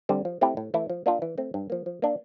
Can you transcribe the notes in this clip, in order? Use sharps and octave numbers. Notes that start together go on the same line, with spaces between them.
D3 G3 C4
F3
A3 C4 E4 G4
A2
E3 A3 E4
F3
A#3 D4 F4
E3
A3 C4
G2
F3 A#3
F3
A#3 D4